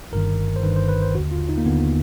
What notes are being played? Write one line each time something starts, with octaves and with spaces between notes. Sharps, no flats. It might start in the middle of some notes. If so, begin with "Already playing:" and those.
G1 G2 D#3 A#4
C5
G1 G2 D#3 B4
C5
B4
C5
D#2 D3 F#4
F4
D#4
A#3
D#2 D3 B3